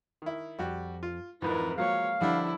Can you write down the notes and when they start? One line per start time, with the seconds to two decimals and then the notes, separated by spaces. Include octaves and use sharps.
0.22 D#3 E4
0.59 F2 G3 F#4 G4
1.03 F4
1.42 F2 G#2 E3 F3 C4 E4 A#4 B4
1.78 F3 F#3 G#3 A#3 C#5 F5
2.21 D3 F3 G3 D4 E4 F#5